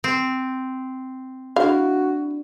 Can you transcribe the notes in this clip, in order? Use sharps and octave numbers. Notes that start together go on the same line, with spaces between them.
C4
D4 E4 F#4 F5